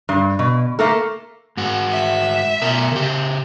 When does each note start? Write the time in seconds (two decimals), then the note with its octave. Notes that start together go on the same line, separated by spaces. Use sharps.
0.09 G2
0.39 B2
0.79 A3 A#3 A4
1.57 G#2 F#4
1.90 E5
2.62 B2 A#4
2.92 C#3 G4